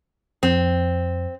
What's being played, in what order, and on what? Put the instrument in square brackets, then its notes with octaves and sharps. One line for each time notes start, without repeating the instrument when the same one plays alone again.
[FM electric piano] F2 [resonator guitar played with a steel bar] C4